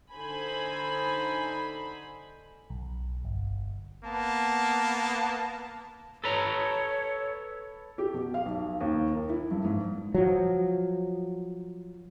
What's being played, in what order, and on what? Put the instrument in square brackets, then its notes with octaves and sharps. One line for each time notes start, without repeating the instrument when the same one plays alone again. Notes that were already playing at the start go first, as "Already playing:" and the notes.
[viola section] D3 D#4 C5 G#5 B5
[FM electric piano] B1
G1
[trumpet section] A#3 B3 A5
[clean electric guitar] A4 B4 A#5 [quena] C#5
[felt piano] G4
B2
F5
B1
D#2
A#4
E4
G2
G#2
[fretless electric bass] F3 F#3